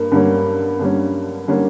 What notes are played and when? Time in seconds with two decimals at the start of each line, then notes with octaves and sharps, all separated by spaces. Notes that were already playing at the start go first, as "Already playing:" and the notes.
Already playing: G2 A#3
0.12 G2 D3 G3 A#3 C#4
0.79 G2 D3 G3 A#3 C#4
1.48 D3 G3 A#3 C#4